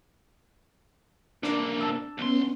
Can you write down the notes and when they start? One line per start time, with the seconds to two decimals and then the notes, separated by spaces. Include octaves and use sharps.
1.43 C3 A#3 D4
1.81 A5 E6
2.18 B1 B3 C#4 C6